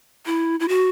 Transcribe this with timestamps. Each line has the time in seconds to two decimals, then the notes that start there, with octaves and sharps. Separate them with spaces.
0.26 E4
0.60 E4
0.68 F#4